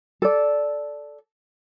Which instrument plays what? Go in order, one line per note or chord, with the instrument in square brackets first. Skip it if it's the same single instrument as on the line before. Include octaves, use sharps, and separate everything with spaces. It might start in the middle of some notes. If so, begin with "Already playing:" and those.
[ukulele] A4 D5